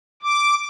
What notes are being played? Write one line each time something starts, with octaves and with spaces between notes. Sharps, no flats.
D6